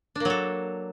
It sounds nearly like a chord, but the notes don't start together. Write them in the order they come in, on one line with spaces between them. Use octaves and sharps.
D4 A#3 F#3 A4